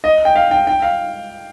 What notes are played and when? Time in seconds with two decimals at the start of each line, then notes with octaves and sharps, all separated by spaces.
0.04 D#5
0.25 G5
0.36 F5
0.51 G5
0.67 G5
0.82 F5